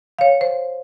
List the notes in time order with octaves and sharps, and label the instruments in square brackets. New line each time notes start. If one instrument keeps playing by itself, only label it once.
[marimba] C#5 F5
C5